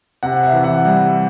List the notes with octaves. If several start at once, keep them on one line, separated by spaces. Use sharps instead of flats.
C3 F#5
E5
E3
F#5
G3